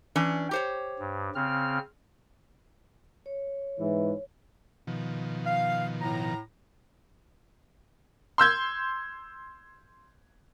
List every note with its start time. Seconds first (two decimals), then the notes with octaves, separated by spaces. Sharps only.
0.16 E3 C#4 D4
0.51 G4 C5 C#5
0.99 G2
1.35 C#3 C4 F6
3.26 C#5
3.79 G#2 E3
4.87 B2 D#3 F3
5.46 F5
6.01 A2 A#5
8.38 C6 E6 G6 G#6